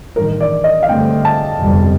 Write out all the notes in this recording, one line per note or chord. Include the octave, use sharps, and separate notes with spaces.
A1 G2 D#3 A#4
D5
D#5
F5
G2 D3 A3 C4 G5
A5
G1 F2 C3 G3